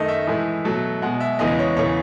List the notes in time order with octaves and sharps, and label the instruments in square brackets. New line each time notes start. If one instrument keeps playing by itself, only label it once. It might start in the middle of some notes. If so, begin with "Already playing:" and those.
Already playing: [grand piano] F#2 D#3 A3 D#5
E5
A2 E3 G#3
B2 F#3 A3
B2 G#3 F#5
E5
E2 C#3 E3 G#3 D#5
C#5
E2 C#3 E3 C#5